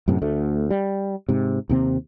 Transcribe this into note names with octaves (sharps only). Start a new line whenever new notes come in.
F#2 A2 C3
D2 A3
G3
G#2 C3
D#2 C3 C4